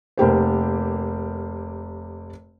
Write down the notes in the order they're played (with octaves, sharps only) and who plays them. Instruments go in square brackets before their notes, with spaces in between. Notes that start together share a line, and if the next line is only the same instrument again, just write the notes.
[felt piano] F1 A#3 G4 C5